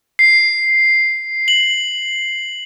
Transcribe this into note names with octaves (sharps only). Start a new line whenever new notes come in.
C7
F#7